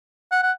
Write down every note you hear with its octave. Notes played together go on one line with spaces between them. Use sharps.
F#5
F#5